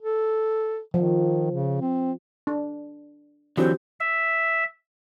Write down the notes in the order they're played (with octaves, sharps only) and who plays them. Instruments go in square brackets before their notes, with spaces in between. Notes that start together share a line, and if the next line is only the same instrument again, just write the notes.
[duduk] A4
[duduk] D#3 [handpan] F3
[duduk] C#3
C4
[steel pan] D4
[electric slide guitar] D3 E3 F#3 [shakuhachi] C4 [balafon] F#4 G4
[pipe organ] E5